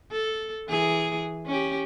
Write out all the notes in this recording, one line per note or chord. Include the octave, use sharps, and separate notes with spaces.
A4
E3 G#4
C#4 G4